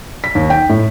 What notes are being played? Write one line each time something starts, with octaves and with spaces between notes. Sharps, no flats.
B6
D#2
G5
A2